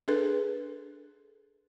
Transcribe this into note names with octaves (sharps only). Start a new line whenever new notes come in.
D4 G#4 A4 B4